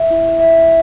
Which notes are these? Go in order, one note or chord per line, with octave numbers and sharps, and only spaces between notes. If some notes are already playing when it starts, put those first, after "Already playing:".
Already playing: E5
E4
E5